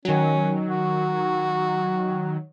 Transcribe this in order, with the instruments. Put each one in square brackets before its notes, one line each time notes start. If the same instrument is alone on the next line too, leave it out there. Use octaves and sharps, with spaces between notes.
[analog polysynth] D#3 F#3 [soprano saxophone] C#4
[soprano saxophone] F#4